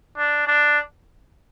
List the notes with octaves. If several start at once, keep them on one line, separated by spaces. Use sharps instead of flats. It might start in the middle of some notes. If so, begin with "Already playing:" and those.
D4
D4